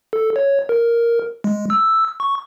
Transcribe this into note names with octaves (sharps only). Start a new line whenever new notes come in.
A4
C#5
A#4
G#3
E6
C#6